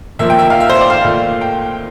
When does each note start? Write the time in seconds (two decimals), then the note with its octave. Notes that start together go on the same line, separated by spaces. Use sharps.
0.19 A#2 F3 A#3 E5
0.30 G5
0.39 E5
0.50 F5
0.60 E5
0.69 C5
0.81 D5
0.90 F5
1.01 A#2 A3
1.41 G5